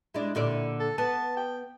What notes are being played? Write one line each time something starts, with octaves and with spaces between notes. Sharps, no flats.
G#3 D4 E4
A#2 D3 D5
A4
B3 A5
G5